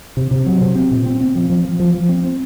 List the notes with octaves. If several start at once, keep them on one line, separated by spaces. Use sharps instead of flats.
C3
C3
F#3
C3
C4
A#2
C4
C4
F3
F3
F3
F3
F3
C4
C4